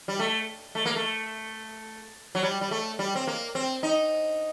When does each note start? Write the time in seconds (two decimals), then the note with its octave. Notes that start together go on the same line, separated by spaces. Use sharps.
0.08 G3
0.19 A3
0.75 A3
0.86 A#3
0.96 A3
2.35 F#3
2.43 G3
2.61 G3
2.71 A3
2.99 G3
3.15 C4
3.27 A#3
3.55 C4
3.83 D#4